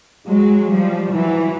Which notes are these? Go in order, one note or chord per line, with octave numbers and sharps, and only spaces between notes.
F#3 G#3
F3 G3
E3 F#3